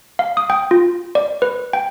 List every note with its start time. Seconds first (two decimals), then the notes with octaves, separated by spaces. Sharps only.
0.19 F5
0.37 D#6
0.50 G5
0.71 F4
1.15 D5
1.42 B4
1.73 G5